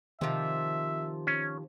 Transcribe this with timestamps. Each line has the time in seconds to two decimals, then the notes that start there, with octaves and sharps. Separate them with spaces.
0.21 C3 D#3 F3 E5
1.27 C#4